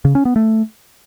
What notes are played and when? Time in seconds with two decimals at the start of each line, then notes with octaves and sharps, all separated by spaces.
0.05 C#3
0.15 C#4
0.25 B3
0.36 A3